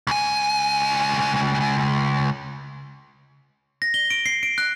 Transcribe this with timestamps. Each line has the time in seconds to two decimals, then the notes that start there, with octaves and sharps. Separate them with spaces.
0.07 C#2 G#5
3.82 A#6
3.94 G7
4.10 D7
4.26 C7
4.43 D7
4.58 F#6